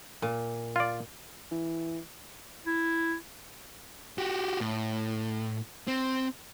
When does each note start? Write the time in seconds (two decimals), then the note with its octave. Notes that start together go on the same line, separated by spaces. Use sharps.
0.22 A#2
0.76 F4 D5
1.51 E3
2.66 E4
4.18 F#4 G4
4.60 A2
5.88 C4